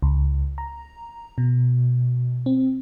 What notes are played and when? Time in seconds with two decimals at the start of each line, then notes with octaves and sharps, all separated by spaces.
0.03 C#2
0.58 A#5
1.38 B2
2.46 C4